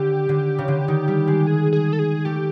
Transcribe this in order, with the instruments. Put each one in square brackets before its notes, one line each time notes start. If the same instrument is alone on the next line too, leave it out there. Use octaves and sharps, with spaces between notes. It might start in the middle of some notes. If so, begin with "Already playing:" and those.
Already playing: [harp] D3 [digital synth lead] G4
[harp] D3
C#3
D3
D#3
G3
G#3
[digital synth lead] G#4
G#4
A4
G#4
[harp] A3 [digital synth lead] G4